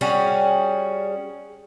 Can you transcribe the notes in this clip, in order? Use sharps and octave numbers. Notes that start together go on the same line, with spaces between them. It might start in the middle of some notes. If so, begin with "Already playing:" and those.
G3 C#4 F#4 G#4